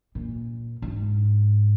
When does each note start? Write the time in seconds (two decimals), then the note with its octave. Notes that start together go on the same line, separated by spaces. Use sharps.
0.15 A#2
0.82 G#2